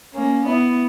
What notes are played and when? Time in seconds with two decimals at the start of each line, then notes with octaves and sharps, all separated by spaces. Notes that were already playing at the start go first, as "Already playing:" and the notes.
0.15 A#3 C#4
0.46 B3 E4